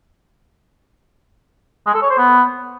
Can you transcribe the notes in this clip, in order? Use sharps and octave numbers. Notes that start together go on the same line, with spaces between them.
G#3
A4
C#5
C5
B3